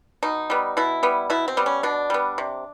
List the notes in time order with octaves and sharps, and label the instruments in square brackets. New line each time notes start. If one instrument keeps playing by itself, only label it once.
[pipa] B2 D#4
G3 B3
B2 E4
G3 B3
B2 E4
C4
G3 B3
C#4
B2 D4
G3 B3
C3